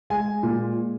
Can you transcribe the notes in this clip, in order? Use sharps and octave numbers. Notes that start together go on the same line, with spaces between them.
G#3 G#5
A#2